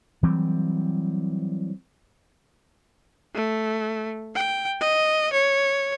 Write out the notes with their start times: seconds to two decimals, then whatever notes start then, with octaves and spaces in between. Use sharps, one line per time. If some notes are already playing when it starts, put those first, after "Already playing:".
0.23 E3 F#3 G3 C4
3.35 A3
4.35 G5
4.80 D#5
5.33 C#5